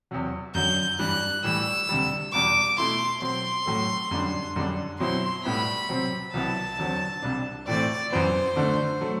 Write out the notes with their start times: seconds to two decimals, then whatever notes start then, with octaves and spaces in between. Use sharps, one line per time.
0.11 E2 C3 F#3
0.55 F#2 D3 F#3 G6
0.99 G2 E3 G3 F#6
1.44 A2 E3 G3 E6
1.89 D2 C3 G3
2.33 E2 B2 G3 D6
2.77 B2 A3 E4 C6
3.21 B2 F#3 C4 C6
3.66 A2 F#3 A3
4.11 F#2 D3 G3 D4
4.56 F#2 D3 G3 D4
5.00 B2 F#3 C4 E4 C6
5.44 A2 G3 B3 E4 B5
5.89 C3 F#3 C4
6.34 C2 C3 F#3 B3 E4 A5
6.78 E2 D3 F#3 C4
7.22 C2 C3 G3 D4
7.67 A2 E3 A3 C4 D5
8.12 F#2 E3 B3 C5
8.56 D2 D3 A3 D4
9.01 F#3 A3